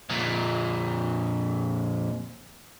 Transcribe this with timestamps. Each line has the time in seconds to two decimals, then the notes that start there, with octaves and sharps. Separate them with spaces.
0.10 F2 A#2